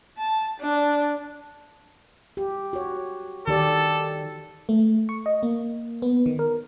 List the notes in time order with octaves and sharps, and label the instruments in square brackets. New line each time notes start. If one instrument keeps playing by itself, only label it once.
[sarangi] A5
D4
[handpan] G4
F#4 C#5
[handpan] D#3 G4 D5 [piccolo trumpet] A4
[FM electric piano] A3
C#6
D#5
A#3
B3
D#3
A#4